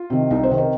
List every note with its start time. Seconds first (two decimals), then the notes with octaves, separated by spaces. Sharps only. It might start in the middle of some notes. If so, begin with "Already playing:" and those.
Already playing: F4
0.10 C3 D#3
0.31 C2 D#4
0.43 C5
0.51 C3 D#3
0.58 A#4